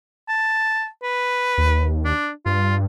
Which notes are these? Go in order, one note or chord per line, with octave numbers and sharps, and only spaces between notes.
A5
B4
D#2
D4
G2 F4